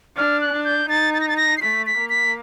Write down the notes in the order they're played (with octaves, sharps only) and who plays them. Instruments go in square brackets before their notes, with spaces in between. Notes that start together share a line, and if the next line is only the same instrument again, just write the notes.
[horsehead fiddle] D4 [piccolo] F6
[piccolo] F#6
[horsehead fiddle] D4
[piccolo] G6
[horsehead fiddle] D#4 [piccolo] A6
[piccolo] A6
A#6
A6
A#6
C7
[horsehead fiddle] A3 [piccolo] B6
[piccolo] B6
[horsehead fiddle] A#3
[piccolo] B6